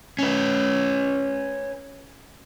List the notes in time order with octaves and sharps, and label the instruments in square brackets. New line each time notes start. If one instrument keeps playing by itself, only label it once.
[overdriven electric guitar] C#4 B4